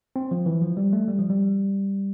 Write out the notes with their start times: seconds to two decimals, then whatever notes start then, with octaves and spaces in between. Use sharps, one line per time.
0.16 C4
0.31 F3
0.46 E3
0.62 F3
0.77 G3
0.93 A3
1.08 G3
1.19 F3
1.30 G3